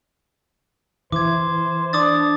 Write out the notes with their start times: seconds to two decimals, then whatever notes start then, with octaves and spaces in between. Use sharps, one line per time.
1.12 E3 C5 D6 G#6
1.93 D4 D6 D#6 A6